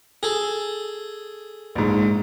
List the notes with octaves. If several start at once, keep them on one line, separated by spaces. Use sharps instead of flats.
G#4 A4
A#1 G#2